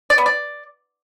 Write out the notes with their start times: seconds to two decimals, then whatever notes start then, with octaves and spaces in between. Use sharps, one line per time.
0.10 D5
0.18 B3
0.26 D5